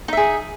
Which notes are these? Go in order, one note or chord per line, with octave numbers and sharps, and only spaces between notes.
D#4 G#4 E5